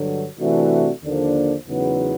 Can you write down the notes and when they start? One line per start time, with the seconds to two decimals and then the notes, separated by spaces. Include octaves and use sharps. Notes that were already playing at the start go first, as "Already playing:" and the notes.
Already playing: G2 D3 F#3
0.38 C3 E3 A3 D4 F#4
1.03 D#2 D3 F3 A#3 D4
1.67 E2 C#3 F#3 B3 D#4